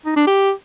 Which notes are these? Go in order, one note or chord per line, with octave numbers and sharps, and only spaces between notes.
D#4
D4
G4